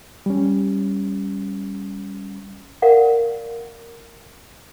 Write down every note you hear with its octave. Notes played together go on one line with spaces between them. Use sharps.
G3 C#4
A#4 D5 F5 F#5